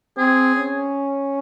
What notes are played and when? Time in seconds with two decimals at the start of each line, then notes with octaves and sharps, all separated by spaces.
0.17 C4 G#4
0.56 C#4